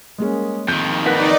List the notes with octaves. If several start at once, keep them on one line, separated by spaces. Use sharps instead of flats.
G3 G#3 A#3 C#4 G#4
F2 D#3 G6
D#4 A#4 B4 D5 F#5 F#6 A#6 B6